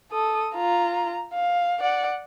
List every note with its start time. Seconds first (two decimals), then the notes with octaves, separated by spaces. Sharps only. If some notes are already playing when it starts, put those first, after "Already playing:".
0.12 A4 D#6
0.54 F4 A#5
1.33 F5
1.80 D5 F#5